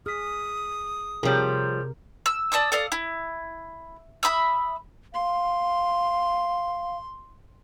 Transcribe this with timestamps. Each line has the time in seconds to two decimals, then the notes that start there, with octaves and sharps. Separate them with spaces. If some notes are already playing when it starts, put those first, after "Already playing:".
0.06 G#4 D#6 F6 B6
1.23 C3 F3 G3 G#4 A#4 C#5 G6
2.26 E6
2.52 D5 A5 D#6 E6
2.72 A4 D5 F5 D#6
2.92 E4
4.23 E5 B5 D#6 E6
5.14 F5 C6